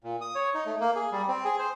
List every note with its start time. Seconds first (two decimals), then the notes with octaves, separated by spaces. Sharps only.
0.04 A#2
0.21 D#6
0.35 C#5
0.54 D#4
0.66 A3
0.80 A#3
0.96 G#4
1.12 G3
1.28 C4
1.45 G#4
1.59 C5